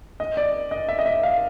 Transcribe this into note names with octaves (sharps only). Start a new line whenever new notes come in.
D#5
D5
D#5
E5
D#5
E5
F5